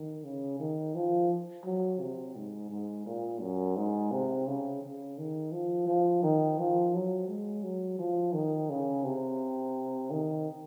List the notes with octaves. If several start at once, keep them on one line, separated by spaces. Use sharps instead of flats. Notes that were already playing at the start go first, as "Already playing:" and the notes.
Already playing: D#3
C#3
D#3
F3
F#3
C3
G#2
G#2
A#2
F#2
G#2
C3
C#3
C#3
D#3
F3
F3
D#3
F3
F#3
G#3
F#3
F3
D#3
C#3
C3
D#3